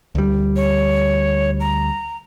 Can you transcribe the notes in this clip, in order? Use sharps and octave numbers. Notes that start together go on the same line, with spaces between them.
D2 G3
C#5
A#5